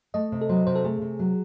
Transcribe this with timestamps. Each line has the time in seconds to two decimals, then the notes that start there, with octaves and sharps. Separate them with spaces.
0.14 A3 D#5
0.32 C3
0.41 A4
0.49 F#3 C5
0.67 C3 C5
0.75 A4
0.84 A3 G#4
1.02 C3
1.19 F#3